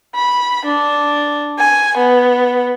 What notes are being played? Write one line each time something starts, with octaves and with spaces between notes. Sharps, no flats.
B5
D4
G#5
B3